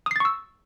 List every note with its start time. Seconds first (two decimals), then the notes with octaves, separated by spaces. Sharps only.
0.06 D#6
0.11 C7
0.16 A6
0.20 C#6
0.25 E6